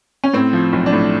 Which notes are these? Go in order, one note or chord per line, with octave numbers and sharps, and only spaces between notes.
C#4
A2 C4
F3
B1
D4
A2